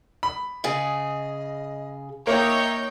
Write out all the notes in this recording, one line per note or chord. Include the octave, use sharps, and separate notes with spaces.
B5
C#3 G#4 D#5
A#3 D#4 C#5 E5 G5